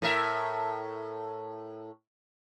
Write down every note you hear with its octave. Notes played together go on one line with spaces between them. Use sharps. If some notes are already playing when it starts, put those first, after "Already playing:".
A2 A#4 E5